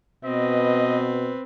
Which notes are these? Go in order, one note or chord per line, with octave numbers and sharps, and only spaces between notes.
B2 C4 B4 D#5